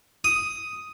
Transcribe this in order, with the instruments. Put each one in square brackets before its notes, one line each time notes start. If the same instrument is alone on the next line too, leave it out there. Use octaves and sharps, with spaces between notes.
[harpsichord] D#6